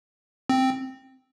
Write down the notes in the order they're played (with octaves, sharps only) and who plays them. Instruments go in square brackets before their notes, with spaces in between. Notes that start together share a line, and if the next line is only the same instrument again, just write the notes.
[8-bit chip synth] C4